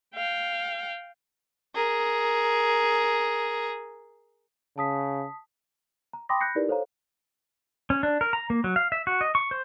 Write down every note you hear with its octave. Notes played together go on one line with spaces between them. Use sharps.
F5 G5
G#4 A#4
C#3 A5 D#6 B6
A#5
G5 B5 C6 D6 D#6 A#6
B5 F#6 G6 A#6 C7 C#7
D#4 E4 G4 A#4 B4 D5
A4 C5 C#5 F5 A#5
C#4
D4
A#4
A#5
A#3
F#3
F5
E5
F#4
D#5
C#6
C5